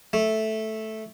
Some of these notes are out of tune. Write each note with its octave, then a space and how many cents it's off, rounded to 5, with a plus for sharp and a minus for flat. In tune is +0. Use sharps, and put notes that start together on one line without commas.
A3 -5